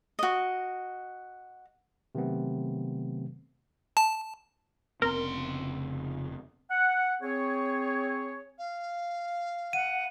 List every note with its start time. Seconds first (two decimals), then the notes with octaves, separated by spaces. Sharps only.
0.19 F#4 D#5
2.15 C3 D#3 F#3 A3 B3 C4
3.97 A5
5.02 F1 C#3 B3 C4 A#4 C6
6.71 F#5
7.22 C4 G#4 C#5
8.58 F5
9.73 F#5 D#7